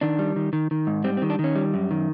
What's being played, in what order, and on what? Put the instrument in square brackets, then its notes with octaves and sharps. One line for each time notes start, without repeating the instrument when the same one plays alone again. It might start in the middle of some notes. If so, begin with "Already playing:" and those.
[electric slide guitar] D#3 D4
G3
D#3
D#3
D#3
G#2
G3 C4
C4
D#3
D4
D#3 C#4
G3
F#2
D#3